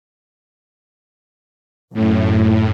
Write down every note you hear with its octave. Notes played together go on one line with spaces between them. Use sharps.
F#2 A2